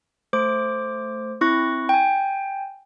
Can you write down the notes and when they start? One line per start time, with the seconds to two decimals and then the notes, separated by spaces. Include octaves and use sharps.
0.33 A3 C5 D6
1.41 C4 E4 C#6 F#6 A#6
1.89 G5 G#5